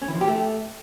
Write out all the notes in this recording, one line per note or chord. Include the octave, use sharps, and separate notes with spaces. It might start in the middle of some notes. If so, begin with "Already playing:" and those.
C#4
E3
F3
G4
A3